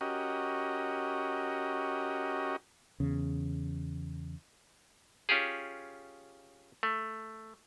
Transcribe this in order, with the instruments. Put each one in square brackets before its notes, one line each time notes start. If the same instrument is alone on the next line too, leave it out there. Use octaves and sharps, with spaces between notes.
[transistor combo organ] C#4 F#4 G4 A#4 D#5
[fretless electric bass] E2 C#3
[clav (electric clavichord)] C#4 F4 G4 G#4
A3